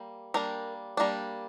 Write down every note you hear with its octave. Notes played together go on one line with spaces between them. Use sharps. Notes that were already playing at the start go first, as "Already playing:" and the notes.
Already playing: G3 A#3
G3 A#3 D4 A#4
G3 A#3 D4